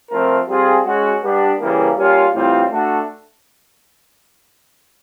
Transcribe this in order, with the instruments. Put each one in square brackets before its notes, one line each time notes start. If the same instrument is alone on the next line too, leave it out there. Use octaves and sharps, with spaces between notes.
[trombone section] F3 A3 C4 F4 A#4
G3 C4 F4 G#4
G#3 C#4 F#4
G3 B3 D4
C#3 E3 G3 A#3
G3 A#3 C#4 F4
A2 E3 G3 C4 F4
A3 D4 F#4 A4